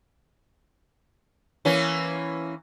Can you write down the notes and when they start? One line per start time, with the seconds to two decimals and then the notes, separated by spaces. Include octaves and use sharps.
1.65 E3 A#3 C#4